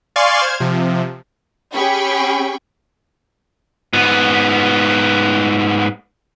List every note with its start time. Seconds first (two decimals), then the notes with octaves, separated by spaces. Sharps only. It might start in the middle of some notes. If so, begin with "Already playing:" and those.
0.16 D5 F5 G#5 C6 C#6
0.41 C5 F6 G#6
0.60 C3 F3
1.73 C#4 G4 G#4 G5 B5 C#6
3.93 G#2 B3